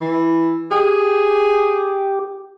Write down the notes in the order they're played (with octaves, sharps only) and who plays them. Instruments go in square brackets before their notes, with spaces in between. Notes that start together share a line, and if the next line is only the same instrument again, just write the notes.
[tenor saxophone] E3
[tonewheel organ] G4 [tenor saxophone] G#4